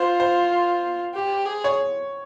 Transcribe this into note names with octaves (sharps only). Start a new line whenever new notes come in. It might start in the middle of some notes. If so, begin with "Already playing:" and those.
Already playing: F4 C5
C5
G4
G#4
C#5